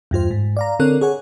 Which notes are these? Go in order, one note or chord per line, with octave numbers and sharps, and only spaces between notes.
E2 G2 F4 C5
G#2
D5 F5 A#5
D3 C4 A4 A#4 C#5 F#6
G#4 C#5 F#5 G#5